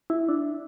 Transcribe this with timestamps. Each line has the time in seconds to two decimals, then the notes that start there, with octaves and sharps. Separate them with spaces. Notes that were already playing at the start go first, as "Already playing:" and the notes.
0.10 E4
0.29 D4